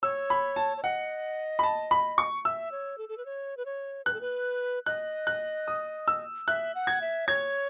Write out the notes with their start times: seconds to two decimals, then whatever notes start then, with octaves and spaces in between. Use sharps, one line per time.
0.03 C#5 E6
0.30 B5
0.56 A5
0.77 C#5
0.83 D#5 F#5
1.59 B5
1.63 A5
1.91 B5
2.18 C#6
2.45 E5 E6
2.72 C#5
2.98 A4
3.09 A4
3.18 B4
3.26 C#5
3.57 B4
3.66 C#5
4.05 B4 F#6
4.14 A4
4.21 B4
4.86 D#5 F#6
5.27 F#6
5.68 D#6
6.08 E6
6.48 E5 F#6
6.75 F#5
6.87 G#6
7.01 E5
7.28 C#5 G#6